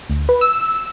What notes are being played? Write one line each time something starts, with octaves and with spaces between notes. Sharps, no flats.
D2
B4
E6